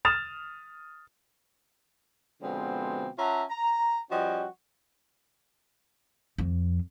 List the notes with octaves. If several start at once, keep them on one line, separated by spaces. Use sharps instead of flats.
D#6 F6 A6 E7 F7
B2 D3 F3 G#3 B3 C4
C#4 F4 E5 F#5 A5 A#5
A#5
F3 G3 C#4 F#4 D#5 G5
F2